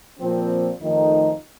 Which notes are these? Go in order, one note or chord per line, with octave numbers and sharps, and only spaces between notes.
A#2 F3 C4
F2 D#3 A3 D#4